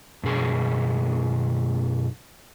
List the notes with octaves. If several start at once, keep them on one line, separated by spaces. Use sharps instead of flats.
F#2 B2 G#4 G#5